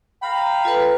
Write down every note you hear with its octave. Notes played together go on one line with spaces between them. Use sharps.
F5 G5 A#5 B5
F4 A4 B4